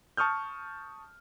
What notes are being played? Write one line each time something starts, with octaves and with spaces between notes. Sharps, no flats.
A5 C#6 D#6 F6 G6